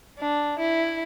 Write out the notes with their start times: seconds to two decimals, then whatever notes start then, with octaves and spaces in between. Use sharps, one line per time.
0.20 D4
0.59 E4